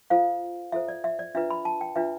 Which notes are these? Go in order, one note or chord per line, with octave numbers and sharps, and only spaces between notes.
F4 A4 C5 F5
F4 A4 C5 E5
D5
E5
D5
D4 F4 B4 E5
B5
A5
G5
D4 F4 B4 E5